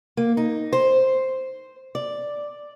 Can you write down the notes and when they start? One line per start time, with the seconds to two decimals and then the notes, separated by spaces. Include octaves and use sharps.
0.17 A#3
0.37 D#4
0.73 C5
1.95 D5